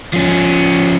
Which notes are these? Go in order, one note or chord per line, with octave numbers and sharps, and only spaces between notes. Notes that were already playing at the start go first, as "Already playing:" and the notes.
F3 C#4